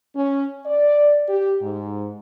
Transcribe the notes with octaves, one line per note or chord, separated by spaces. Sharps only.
C#4
D5
G4
G#2